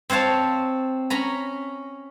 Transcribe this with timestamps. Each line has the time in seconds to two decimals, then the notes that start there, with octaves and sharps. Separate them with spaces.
0.10 C4 C5 C#5 F5 A5
1.10 C#4 A#5 B5